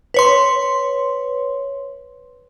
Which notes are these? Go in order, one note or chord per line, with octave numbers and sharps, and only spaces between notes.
B4 C#5 C6